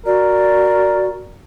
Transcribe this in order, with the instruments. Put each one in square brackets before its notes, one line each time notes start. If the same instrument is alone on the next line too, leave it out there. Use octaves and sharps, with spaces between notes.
[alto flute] F#4 [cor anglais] A#4 [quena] D5